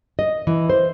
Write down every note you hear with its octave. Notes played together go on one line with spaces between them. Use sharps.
D#5
E3
C5